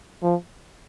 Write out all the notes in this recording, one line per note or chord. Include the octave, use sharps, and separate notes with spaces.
F3